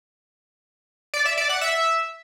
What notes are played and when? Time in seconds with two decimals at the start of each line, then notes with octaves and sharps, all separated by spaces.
1.14 D5
1.26 E5
1.38 D5
1.49 F#5
1.61 E5